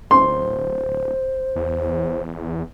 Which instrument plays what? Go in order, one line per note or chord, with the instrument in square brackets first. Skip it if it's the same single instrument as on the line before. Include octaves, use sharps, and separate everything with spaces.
[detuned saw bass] D1 [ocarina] C5 [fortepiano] C6
[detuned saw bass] E2